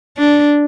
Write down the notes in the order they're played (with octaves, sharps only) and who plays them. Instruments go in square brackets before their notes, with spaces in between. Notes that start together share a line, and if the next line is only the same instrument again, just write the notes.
[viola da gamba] D4